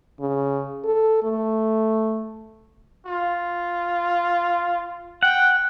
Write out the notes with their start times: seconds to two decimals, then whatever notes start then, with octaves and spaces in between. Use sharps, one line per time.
0.20 C#3
0.85 A4
1.24 A3
3.06 F4
5.23 F#5 G5